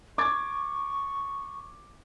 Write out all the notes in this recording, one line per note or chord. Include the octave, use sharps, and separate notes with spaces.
C#6 D6 G#6 A6